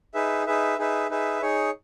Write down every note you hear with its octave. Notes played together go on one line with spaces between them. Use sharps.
D#4 G#4 B4 E5
D#4 G#4 B4 E5
D#4 G#4 B4 E5
D#4 G#4 B4 E5
D#4 G#4 C#5